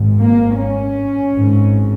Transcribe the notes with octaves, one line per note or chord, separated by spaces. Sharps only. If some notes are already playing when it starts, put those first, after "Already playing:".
Already playing: G#1 G#2
A#3
C#4
G#1 G#2